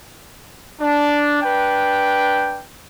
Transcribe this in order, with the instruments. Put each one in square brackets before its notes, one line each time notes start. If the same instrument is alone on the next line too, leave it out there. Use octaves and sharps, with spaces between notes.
[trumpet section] D4
D4 B4 G5